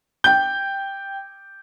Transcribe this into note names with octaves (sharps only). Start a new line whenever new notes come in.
G5 G6